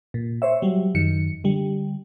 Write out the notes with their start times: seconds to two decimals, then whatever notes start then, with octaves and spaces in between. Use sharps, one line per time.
0.14 A#2
0.42 C5 C#5 E5
0.62 F#3 G3
0.95 F#2 D#3 C#7
1.44 D3 G3